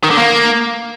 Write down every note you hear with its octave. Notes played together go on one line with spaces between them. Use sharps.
D#3
D3
A#3